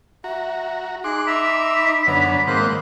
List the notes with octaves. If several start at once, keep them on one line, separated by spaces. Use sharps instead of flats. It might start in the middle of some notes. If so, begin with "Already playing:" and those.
F#4 E5 A#5
D#4 G#4 C6 D6 F#6
D#4 E5 A#5 B5 E6
F#2 D3 B3 B4 C#5 A#5
G#2 D#3 A#3 C4 C5 F5 B5 F#6